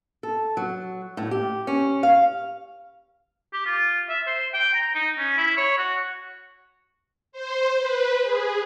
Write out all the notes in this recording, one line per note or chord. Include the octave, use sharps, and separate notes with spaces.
A4
F#3
A2
G4
C#4
F5
G4
F4
E5
C5
G5
A#5
D#4
C#4
E4
C#5
F#4
C5
B4
G#4